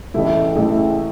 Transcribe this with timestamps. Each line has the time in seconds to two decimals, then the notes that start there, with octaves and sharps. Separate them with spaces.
0.14 A1 A2 E3 A3 E4
0.56 A1 A2 E3 A3 E4